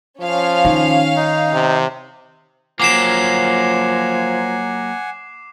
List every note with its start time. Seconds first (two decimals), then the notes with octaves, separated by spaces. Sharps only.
0.20 F3 C#4 F5
0.65 D#3
1.16 D#4
1.53 C3
2.80 F3 F#3 A#3 F#5 G#5 D6 C7 E7